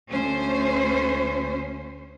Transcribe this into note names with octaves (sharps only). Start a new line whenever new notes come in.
D2 A3 C#4 C5